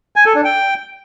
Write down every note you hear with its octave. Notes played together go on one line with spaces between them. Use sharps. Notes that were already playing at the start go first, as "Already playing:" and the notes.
G#5
A4
D4
G5